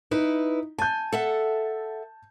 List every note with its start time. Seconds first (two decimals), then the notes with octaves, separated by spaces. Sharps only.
0.11 D#4 E4 B4
0.78 G#5 A5 G6
1.12 A4 E5 F#5